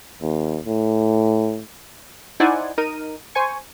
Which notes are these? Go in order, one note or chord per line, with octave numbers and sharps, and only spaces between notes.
D#2
A2
D#4 E4 C5 D5 F#5 G#5
D#4 A#4 D#7
C5 G#5 C#6